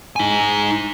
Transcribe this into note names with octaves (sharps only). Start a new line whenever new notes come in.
D#4 G#5